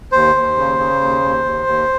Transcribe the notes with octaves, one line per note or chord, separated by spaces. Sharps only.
D#2 C5
D#2
C#3
C#3
D#2
D#2
D#2
D#2